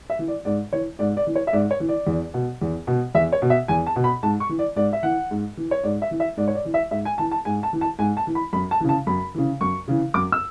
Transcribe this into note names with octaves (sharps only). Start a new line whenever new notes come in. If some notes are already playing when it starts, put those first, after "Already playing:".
E5
E3
D5
G#2 D5
E3 C#5
G#2 D5
D5
E3
C#5
E5
G#2 D5
C#5
E3
D5
E2
B2
E2
B2
E2 E5
C#5
B2
E5
E2 G#5
A5
B2
B5
G#2 A5
C#6
E3
D5
G#2 D5
E5
E3 F#5
G#2
E3
C#5
G#2 D5
E5
E3
E5
G#2 D5
C#5
D5
E3
E5
G#2 E5
G#5
E3 A5
A5
G#2 G#5
A5
E3
A5
G#2 G#5
A5
E3
B5
F#2 B5
A5
C#3 E3
A5
F#2 B5
C#3 E3
F#2 C#6
C#3 E3
F#2 D6
E6